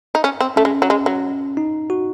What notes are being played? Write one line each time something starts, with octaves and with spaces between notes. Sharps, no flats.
D#4
C#4
C4
A3 C#4
G#3
F#3
G#3
F#3
D#4
F#4